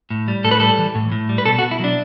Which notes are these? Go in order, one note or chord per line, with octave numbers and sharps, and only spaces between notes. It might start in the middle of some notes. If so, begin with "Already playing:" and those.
A2
G3
A2 A4
B4
G3 A4
E3
A2
A2
G3
B4
B2 A4
F#4
B2
E4
F#3 D4